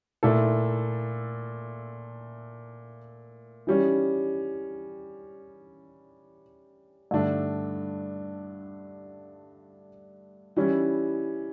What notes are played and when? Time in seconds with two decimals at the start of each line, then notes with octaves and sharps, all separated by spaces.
0.23 A#2 A3 E4 A4
3.67 E3 G3 C#4
7.11 G2 D3 A3 D4
10.56 E3 G3 C#4 E4